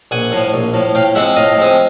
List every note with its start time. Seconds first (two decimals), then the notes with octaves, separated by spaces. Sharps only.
0.11 A#1 F#5 G#5
0.32 A2 F3
0.53 A#1
0.74 A2 F3
0.95 A2 F5 G5
1.15 F3 G#3 C4 E5 F#5
1.36 A2 D#5 F5
1.57 F3 G#3 C4